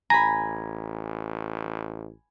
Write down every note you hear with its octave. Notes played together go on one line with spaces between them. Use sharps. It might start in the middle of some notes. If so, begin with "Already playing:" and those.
A1 G#5 A#5 B5